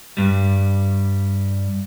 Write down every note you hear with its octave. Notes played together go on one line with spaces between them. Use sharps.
G2 G3